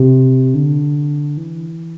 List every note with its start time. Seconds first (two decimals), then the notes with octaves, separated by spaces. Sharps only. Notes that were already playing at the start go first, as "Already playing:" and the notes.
Already playing: C3
0.54 D3
1.37 E3